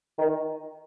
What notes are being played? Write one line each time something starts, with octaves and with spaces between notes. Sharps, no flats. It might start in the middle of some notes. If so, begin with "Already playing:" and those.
D#3